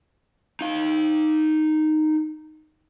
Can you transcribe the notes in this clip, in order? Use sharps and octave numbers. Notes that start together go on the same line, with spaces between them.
D#4 F5